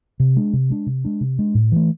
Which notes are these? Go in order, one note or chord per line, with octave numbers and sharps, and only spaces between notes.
C3
G#3 D4
C3
G#3 D4
C3
G#3 D4
C3
G#3 D4
A2
E3 A3